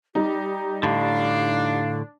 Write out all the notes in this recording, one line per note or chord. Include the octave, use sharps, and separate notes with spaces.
G3 D#4 G4
A2 D3 D4 F5